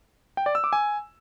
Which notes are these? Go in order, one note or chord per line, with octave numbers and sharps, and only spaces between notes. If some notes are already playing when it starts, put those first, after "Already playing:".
G5
D5
E6
D6
G#5